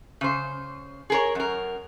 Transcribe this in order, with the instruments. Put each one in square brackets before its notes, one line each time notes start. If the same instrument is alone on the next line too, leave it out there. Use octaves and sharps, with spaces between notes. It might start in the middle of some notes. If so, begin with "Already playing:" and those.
[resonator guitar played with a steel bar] C#3 C5
G#4 A#4 C#5
F#2 A#4